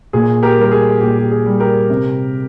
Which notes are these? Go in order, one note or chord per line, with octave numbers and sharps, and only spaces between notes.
A#2 G#4
G4 A#4
G3 A#4
G#4
A#2 G4
G4
G#4
G3
G4 A#4
C3